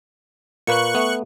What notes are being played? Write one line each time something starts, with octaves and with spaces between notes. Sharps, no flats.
A#2 A#3 B4 C#6 F#6
A3 B3